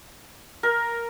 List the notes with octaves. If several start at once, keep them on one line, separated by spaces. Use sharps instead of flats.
A#4